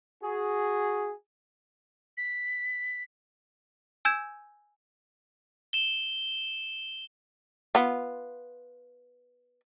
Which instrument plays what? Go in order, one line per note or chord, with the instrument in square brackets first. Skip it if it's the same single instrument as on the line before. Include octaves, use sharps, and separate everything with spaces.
[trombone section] F#4 G#4
[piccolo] B6
[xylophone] G#5 E6 G6 G#6 E7
[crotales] E7 G7
[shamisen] B3 F4